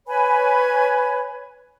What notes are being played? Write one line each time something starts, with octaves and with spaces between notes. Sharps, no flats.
B4 C#5 G#5 B5